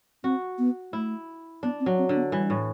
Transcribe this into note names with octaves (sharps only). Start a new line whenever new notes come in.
C4 F#4
B3
A3 E4
B3 D4
C4
F#3
C4
D3
B3
E3 G3
A2